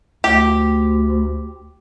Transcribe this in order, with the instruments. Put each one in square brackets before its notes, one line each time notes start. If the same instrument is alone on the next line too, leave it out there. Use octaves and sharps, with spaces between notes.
[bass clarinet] D2 [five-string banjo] G4